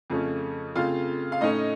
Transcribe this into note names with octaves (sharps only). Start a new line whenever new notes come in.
F2 C#3 A3 C#4
C#3 A3 C4 F4 F5
F5
A2 A3 C#4 D#4 D#5